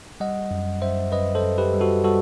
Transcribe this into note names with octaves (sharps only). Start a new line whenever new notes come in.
G3 D#5 F#5
F#2
F#2 C5 E5
F#2 B4 D#5
A4 C5
F#2
G4 B4
G3
F#4 A4
G3 F#4 A4